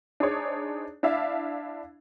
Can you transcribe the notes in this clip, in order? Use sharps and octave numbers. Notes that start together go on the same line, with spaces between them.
D4 D#4 G#4 C5 C#5
D4 E4 E5 F5